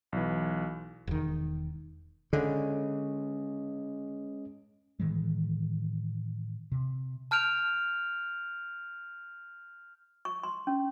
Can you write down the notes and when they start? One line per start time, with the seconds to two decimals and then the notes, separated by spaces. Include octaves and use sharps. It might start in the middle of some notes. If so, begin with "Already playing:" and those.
0.12 B1 E3
1.07 E1 D#3
2.33 D3 G#3 C#4 D#5
5.00 A2 D#3 E3 G#3
6.72 C3
7.31 A5 F6 G6 D7 F7
10.25 C#6
10.43 C6
10.67 C#4